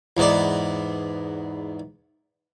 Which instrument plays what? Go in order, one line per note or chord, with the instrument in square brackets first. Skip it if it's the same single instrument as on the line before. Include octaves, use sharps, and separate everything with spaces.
[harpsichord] E2 G#2 B3 D5